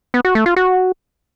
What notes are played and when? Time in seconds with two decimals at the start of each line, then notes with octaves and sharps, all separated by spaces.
0.14 B3
0.25 F#4
0.35 A3
0.46 F4
0.56 F#4